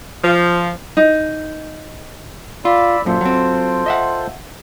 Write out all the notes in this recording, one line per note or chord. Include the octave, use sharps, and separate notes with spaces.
F3
D#4
F4 D5 B5 E6
F#2 A#2 F4 A4 C5
F#3 C4
D#5 E5 F#5